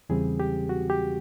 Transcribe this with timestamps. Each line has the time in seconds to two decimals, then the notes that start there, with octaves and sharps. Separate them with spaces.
0.09 E2 C#3 E3 G3 C4 G#4
0.40 G4
0.69 F#4
0.90 G4